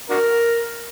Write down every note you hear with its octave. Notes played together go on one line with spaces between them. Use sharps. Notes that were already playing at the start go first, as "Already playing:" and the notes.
D4 F#4 A#4